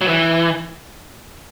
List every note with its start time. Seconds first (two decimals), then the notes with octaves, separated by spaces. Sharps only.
0.01 F#3
0.08 E3